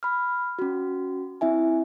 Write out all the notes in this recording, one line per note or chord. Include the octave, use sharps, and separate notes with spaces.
B5 F6
C#4 F#4
C4 E4 E5 G#5